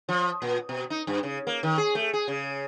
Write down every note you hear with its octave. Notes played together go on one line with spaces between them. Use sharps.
F3
A#2
B2
D#4
G2
C#3
A#3
D#3
G#4
A3
G#4
C#3